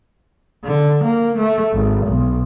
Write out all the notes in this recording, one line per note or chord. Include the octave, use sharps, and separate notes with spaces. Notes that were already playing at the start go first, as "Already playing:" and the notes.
D3
A#3
A3
G#1
B1